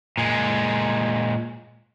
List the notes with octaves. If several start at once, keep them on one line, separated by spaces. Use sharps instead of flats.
A#2 G#3